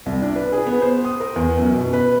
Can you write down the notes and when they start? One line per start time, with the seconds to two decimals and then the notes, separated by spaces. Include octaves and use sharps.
0.06 C2
0.22 D4
0.36 B4
0.52 G#4
0.66 B3
0.82 C5
1.05 D#6
1.20 A#4
1.36 E2
1.58 F#2
1.74 B2
1.93 B4